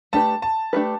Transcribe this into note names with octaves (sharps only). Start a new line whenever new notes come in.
A3 D4 G4 B4 A5
A5
A3 D4 G4 B4